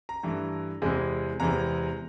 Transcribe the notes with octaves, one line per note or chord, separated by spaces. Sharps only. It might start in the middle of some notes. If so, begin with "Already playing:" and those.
A#5
G2 E3 A3
E2 C3 E3 G#3
E2 C3 E3 G#3 A#5